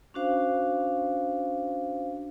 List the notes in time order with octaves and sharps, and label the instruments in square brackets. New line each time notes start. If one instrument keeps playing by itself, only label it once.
[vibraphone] C#4 D4 F#4 C5 F5